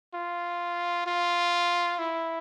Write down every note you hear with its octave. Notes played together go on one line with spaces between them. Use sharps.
F4
F4
E4